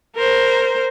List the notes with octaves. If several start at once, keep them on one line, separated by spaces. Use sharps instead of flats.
A#4 C5